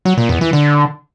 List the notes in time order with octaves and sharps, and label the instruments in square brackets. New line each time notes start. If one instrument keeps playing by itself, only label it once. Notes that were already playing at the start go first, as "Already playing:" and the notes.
[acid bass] F#3
A#2
E2
E3
D3